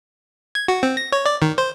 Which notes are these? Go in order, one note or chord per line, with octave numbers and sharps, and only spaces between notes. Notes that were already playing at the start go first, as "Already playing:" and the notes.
G#6
F#4
C4
A#6
C#5
D5
D#3
C5